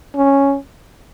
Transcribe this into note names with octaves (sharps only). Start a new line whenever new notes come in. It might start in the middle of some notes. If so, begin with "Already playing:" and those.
C#4